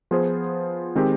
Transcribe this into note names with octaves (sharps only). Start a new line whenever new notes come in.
F3 B3 F4 G#4 C5
D#3 G#3 C4 G4